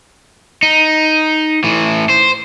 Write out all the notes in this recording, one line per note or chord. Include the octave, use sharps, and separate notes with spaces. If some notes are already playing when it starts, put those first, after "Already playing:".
D#4
A2 E3
C5